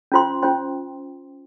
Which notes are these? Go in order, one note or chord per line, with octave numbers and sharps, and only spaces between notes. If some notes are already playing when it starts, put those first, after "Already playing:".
C#4 F4 C5 G5 C6
C#4 F4 C5 G5 C6